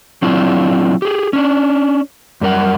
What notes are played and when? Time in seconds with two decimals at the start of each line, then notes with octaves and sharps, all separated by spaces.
0.22 F#3 C4 D4 E4 F4
1.02 G4 G#4
1.33 C#4 D4
2.41 F#2 G3 A#4 F#5